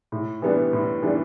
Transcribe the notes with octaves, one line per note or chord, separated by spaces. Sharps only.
A2
E3 G3 B3 D4
A2
E3 G3 B3 D4